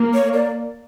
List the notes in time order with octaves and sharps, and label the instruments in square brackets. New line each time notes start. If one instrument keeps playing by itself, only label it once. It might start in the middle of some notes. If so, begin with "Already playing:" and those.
Already playing: [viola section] A#3
[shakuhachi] C#5
D5